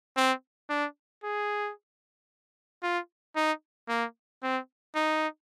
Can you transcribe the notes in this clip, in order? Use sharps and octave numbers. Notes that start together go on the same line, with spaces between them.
C4
D4
G#4
F4
D#4
A#3
C4
D#4